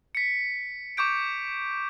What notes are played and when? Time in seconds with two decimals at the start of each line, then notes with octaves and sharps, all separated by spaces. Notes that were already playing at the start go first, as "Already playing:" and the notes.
0.15 B6 C#7
0.97 C#6 D6 G6 D7